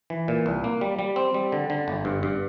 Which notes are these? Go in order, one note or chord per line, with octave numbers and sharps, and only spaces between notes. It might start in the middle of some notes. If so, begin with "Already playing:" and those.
E3
A#2
C2
A#3
G3
G3
C4
G3
D3
D3
G1
G2
G2